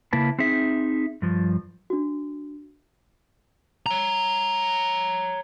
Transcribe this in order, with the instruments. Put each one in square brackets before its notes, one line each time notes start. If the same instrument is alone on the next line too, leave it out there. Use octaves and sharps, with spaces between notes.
[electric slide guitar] C#3 A#3 E4 B4 A5
C4 D#4 G#4 E5
G2 F3
[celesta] D4 F#4
[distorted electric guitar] C#5 A#5